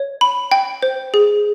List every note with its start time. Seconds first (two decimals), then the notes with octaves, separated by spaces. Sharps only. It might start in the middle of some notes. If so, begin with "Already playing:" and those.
Already playing: C#5
0.21 B5
0.52 G5
0.82 C5
1.14 G#4